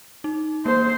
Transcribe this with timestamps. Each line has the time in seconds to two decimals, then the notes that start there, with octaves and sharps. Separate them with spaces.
0.24 D#4
0.66 A#3 C5